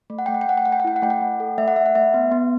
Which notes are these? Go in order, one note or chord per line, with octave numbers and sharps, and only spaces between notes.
A3
F#5
A3 G5
F#5
G5
A3 F#5
G5
A3 F#5
G5
F#5
E4 G5
F#5
A3 G5
F#5
A3
A4
A3 E5
F#5
A3 E5
F#5
A3 E5
B3
B3